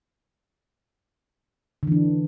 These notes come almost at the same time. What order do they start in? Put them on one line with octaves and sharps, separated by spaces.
D3 E3 D4